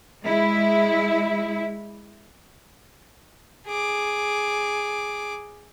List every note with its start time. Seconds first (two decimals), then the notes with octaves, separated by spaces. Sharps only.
0.23 G#3 E4
3.68 G#4 D6